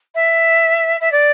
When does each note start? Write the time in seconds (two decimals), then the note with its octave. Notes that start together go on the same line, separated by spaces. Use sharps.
0.15 E5
1.01 E5
1.12 D5